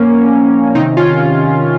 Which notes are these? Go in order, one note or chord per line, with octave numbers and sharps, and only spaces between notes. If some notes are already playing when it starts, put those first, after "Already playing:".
Already playing: A#2 F3 A#3 C#4
C3 D#3 C4 D#4
C#4 F4